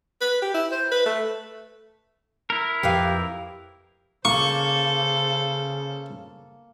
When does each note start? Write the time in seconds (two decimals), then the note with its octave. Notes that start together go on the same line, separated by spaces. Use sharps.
0.21 B4
0.42 G4
0.54 E4
0.72 C5
0.91 B4
1.06 A3
2.50 E4 A#4
2.83 F2 G4 B4 F5
4.25 C#3 A#3 A4 C5 C#6